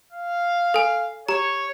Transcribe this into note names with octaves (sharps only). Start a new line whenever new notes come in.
F5
A4 G#5
G4 C#5 A#5